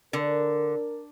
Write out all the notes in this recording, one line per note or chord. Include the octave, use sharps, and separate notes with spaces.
D3 A#4